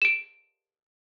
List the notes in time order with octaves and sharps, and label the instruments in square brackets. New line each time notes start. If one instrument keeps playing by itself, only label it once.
[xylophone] D7 E7